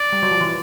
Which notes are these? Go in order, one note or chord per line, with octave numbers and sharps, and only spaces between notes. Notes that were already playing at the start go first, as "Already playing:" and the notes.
Already playing: D5
G3
F#3
F3
E3